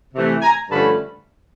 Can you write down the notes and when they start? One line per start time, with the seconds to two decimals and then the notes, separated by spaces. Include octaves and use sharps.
0.14 C3 E3 A3
0.42 G#5 A#5
0.70 G2 D3 F3 A3 C#4 A5 B5